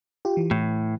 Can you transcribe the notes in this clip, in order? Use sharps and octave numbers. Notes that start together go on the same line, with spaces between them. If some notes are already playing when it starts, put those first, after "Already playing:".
F4 G4
E3
A2